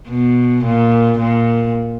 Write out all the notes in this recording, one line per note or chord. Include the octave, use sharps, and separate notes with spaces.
B2
A#2
A#2